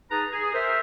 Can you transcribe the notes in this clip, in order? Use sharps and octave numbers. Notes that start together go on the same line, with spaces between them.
D#4 G#4 B4 A5 A#5
G#4
A#4 C5 E5